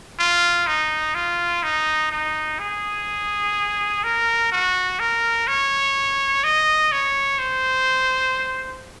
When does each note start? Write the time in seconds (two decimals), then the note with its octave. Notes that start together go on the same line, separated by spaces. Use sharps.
0.19 F4
0.67 D#4
1.15 F4
1.63 D#4
2.11 D#4
2.59 G#4
4.04 A#4
4.52 F#4
5.00 A#4
5.47 C#5
6.44 D#5
6.92 C#5
7.39 C5